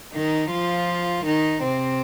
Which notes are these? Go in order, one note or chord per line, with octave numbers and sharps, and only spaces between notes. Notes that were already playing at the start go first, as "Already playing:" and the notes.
D#3 D#4
F3 F4
D#3 D#4
C3 C4